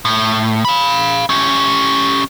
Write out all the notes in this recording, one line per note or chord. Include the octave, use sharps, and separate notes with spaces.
A2
F5 B5
C#4 G4